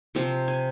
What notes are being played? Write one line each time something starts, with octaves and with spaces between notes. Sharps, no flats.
C3 F3 C4
G#5